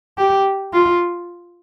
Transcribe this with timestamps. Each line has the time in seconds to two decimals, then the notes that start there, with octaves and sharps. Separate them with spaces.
0.18 G4
0.74 F4